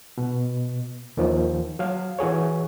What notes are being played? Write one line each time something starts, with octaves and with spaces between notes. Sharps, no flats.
B2
D#2 D#3 F3
F#3 F5
E3 F#4 G#4 C#5